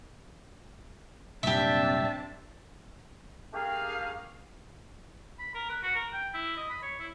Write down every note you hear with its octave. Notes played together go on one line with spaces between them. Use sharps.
C2 F#2 A#2 C4 D4 G4 E5 A5
A3 D4 G4 G#4 A#4 F5
B5
A#4
B4
F#4
A#4
G5
E4
D#5
B5
C#5
E4